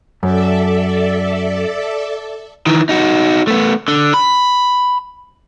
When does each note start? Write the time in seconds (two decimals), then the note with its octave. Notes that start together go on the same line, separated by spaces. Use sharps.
0.23 F#2 A4 D5 E5
2.66 D#3 E3
2.89 D#4 F#4
3.48 A3 B3
3.88 D3
4.14 B5